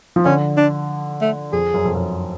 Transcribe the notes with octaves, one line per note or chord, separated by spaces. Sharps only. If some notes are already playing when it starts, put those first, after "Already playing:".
F3
D3 C#4
D4
A3
F2 G#4
F#2
F2
F#2